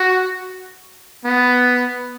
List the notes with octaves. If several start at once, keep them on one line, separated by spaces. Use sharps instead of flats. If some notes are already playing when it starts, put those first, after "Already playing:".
Already playing: F#4
B3